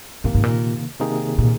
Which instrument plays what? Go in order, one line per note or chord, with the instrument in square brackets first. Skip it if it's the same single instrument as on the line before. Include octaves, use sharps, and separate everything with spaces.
[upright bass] G#2 [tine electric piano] C3 D#3 A#3
[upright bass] G#2
A#2
[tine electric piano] C3 D#3 A#3 D#4 G#4
[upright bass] A#2